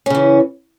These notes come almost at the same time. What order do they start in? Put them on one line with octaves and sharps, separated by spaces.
C#4 C#3 E3